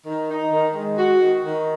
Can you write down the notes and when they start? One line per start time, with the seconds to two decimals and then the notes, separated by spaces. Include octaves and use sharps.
0.06 D#3
0.29 D#4
0.52 D#3
0.75 G#3
0.98 F#4
1.21 D#3
1.44 D#3